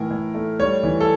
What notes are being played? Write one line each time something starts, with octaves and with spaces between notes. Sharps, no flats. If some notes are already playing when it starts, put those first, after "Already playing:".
Already playing: A2 E3 A#4
A2
A3
G3 C#5
E3
A4